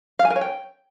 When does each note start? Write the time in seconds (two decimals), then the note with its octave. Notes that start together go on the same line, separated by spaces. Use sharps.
0.19 F5
0.25 G#5
0.30 A#4
0.36 C#5
0.41 G5